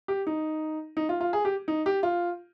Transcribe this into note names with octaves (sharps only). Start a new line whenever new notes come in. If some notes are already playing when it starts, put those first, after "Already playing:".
G4
D#4
D#4
F4
F4
G#4
G4
D#4
G4
F4